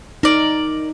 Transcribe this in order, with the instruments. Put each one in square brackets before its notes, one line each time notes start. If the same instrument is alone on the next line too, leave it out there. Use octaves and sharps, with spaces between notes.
[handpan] D#4 [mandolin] A#4 D5